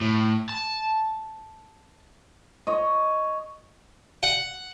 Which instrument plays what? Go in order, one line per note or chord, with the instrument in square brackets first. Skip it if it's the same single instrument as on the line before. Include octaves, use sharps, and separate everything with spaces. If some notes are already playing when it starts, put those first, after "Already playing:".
[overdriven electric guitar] A2
A5
[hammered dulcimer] C#5 D#5
[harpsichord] F#5